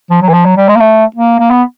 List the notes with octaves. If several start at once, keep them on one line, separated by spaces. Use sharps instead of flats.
F3
F#3
E3
F3
F#3
G3
G#3
A#3
A3
A#3
A#3
B3